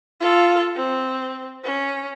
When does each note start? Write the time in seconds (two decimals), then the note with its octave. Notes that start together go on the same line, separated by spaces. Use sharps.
0.20 F4 A4
0.76 C4
1.64 C#4